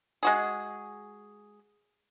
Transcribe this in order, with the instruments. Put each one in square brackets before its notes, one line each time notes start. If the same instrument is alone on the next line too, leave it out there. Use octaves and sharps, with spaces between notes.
[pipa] G#3 F#4 G#4